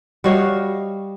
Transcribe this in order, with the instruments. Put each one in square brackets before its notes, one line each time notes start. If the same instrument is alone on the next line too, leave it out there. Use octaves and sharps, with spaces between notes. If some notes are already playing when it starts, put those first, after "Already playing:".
[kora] G3 D#5 F5 [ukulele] F#4 C#5